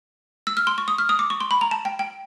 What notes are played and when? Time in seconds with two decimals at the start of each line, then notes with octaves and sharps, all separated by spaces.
0.47 E6
0.57 F6
0.67 C6
0.78 C#6
0.88 D#6
0.98 F6
1.09 D#6
1.19 D6
1.30 C#6
1.41 C6
1.51 B5
1.61 A#5
1.71 A5
1.85 G5
1.99 G5